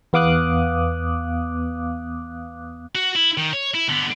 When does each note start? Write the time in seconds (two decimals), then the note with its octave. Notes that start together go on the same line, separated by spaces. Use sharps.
0.13 E2 B3 F5 D6 D#6 F#6
2.95 F#4
3.16 E4
3.37 D#3
3.53 C#5
3.74 E4
3.89 D3 B3